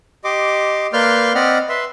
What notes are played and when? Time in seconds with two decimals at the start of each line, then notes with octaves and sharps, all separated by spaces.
0.24 G4 D#5 C6 D6
0.93 A#3 B4 D5 C6 F6 G6
1.35 C4 D5 D#5 F#5 B5 F6
1.69 B4 E5 C6